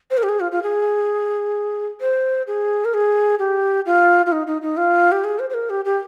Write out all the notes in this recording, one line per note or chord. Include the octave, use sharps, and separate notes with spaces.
C5
A#4
G4
G#4
F4
F4
G#4
C5
G#4
A#4
G#4
G4
F4
F4
D#4
D#4
D#4
F4
G4
G#4
C5
C5
A#4
G4
G4